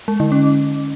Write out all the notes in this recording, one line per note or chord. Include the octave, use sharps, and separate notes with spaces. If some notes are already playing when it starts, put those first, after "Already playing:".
G#3
D3
C#4